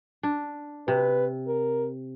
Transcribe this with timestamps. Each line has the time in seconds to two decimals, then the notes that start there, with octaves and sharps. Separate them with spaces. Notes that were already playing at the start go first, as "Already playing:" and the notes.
0.23 D4
0.88 C3 B4
1.47 A#4